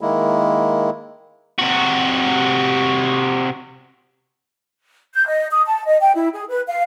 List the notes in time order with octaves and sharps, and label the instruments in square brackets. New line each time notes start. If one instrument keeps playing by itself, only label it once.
[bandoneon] D#3 G#3 A#3 E4
[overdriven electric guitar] C3 F#4
[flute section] G6
D#5
D#6
A5
D#5
G5
E4
G#4
B4
F5